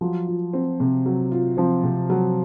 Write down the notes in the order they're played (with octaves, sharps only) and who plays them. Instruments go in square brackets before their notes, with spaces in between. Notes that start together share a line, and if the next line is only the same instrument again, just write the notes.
[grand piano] F3 [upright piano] F#3
[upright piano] F4
C4
C3
F#3
F4
[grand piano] F3 [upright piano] C4
[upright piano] C3
F#3